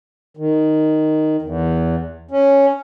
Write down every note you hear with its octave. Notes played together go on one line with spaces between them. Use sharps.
D#3
E2
C#4